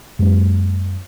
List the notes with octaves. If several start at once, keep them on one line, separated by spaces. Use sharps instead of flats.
F#2 G#3 A#3